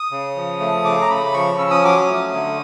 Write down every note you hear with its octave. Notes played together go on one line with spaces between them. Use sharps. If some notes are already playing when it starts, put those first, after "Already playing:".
Already playing: D#6
C#3
F3
A3
C#3 D6
A#5
C#3 B5
F3 C#6
C#4 E6
D#6
F#3 D6
D#6
A3
D3